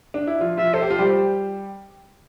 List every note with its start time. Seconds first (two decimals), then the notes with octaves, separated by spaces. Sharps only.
0.14 D4
0.27 E4
0.40 F3 F4
0.57 F3 F4 E5
0.74 A4 C5
0.82 G4
0.90 F4
0.99 G3 G4